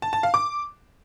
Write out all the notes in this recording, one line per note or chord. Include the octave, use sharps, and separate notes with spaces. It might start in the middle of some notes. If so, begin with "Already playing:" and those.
A5
A5
F5
D6